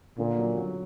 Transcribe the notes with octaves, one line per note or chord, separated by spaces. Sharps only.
A#2 D3
F#3
F#3